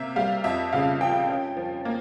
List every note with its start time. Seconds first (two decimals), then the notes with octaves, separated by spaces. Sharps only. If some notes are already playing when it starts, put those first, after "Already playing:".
Already playing: C3 A#3 E5
0.16 G3 F5
0.44 F2 E5
0.73 C#3 F5
1.00 F3 G5
1.29 C#4
1.57 F3
1.85 A#3